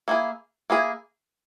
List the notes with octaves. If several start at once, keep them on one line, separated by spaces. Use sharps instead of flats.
A#3 E4 G#4
A#3 E4 G#4